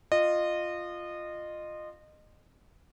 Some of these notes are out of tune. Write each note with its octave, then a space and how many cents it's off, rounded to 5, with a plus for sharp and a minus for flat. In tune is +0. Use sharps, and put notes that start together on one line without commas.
F4 +0 D#5 -25